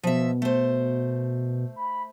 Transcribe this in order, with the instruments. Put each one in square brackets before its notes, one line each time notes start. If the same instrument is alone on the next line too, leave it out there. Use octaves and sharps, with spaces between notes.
[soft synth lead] B2 [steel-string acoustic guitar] F3 E5
[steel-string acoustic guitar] A3 C5
[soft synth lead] B5